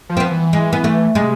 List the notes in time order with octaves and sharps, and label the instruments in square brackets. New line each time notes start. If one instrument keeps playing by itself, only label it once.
[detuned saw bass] F3
[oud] C4
B3
[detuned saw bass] E3
[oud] G#3
B3
A3
[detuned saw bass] C3 [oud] G#3